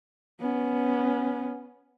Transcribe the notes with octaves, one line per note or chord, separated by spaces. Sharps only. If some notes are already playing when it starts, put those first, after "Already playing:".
B3 C#4